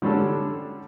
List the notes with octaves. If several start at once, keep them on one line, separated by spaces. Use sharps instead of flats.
D3 G3 C#4 D4 A4